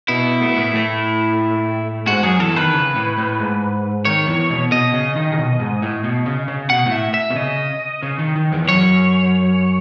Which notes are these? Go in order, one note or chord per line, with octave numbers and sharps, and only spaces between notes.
B2 B3 E4
A3
B3
A2 A3
A2 A3
G#2 G#3 F#4
F#2 F#3 G#4
E2 E3 A4
D#3 B4
C#3
A2
A2
G#2
D#3 C#5
E2 E3
B2
B2 D#5
C#3
D#3
C#3
B2
G#2
A2
B2
C#3
C#3
B2 F#5
A2
E5
E5
B2
C#3 D#5
C#3
D#3
D#3
E2 E3
E3
F#2 F#3 C#5